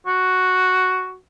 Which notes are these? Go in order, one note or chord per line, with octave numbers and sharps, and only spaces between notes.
F#4